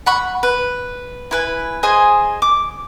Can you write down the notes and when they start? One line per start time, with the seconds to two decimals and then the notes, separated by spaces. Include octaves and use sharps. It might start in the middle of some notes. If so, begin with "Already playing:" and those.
0.06 F#5 B5 C#6
0.43 B4
1.31 E4 B4 G#5
1.83 G#4 C5 D#5 G#5
2.42 D6